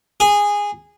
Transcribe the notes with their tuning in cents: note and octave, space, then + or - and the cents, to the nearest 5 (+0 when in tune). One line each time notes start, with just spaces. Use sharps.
G#4 -15